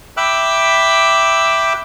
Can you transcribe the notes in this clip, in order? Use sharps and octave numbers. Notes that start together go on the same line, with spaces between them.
E5 G5 B5 D6 E6 F#6